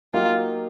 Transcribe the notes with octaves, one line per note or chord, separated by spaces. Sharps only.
F#3 A#3 D#4 F4 G4